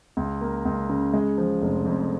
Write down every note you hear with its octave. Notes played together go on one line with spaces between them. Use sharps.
C#2
A#3
C#2
C#3
G#3
F3
F1
F2